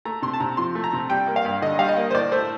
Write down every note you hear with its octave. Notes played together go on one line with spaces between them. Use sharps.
A3 A#5
C3 C6
A5
C3 A#5
F3 C6
A3
A#5
C3
G3 G5
A#3
F5
G2
D3 D#5
G3 F5
D#5
A#3
C5
A2 D5
A3 C5